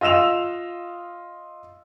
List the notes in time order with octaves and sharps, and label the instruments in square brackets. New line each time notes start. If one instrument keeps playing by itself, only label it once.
[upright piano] F4 D#5 E6 E7 F7